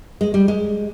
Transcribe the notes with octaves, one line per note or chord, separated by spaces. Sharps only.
G#3
G3
G#3